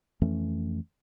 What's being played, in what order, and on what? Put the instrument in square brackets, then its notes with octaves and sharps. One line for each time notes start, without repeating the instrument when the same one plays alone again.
[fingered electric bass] F2 E3 A3 C#4